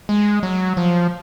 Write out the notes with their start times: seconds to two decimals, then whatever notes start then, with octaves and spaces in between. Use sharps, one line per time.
0.09 G#3
0.43 F#3
0.77 F3